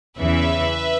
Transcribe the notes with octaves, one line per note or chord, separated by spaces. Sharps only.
E2 C#3 E3 B4 E5